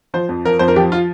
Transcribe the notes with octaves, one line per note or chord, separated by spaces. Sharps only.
F3 C5
F2
F3 A#4
F2 C5
A#4
F3 G4
F4